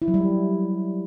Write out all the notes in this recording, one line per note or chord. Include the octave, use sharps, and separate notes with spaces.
E4
F#3
G3